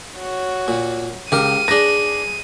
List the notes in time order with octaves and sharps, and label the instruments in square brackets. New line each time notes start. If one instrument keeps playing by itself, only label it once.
[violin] F#4 C#5
[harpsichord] A#2
[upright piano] C#2 [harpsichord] G4 A#4 [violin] D#7
[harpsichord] D4 B4 [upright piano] G#4 A#6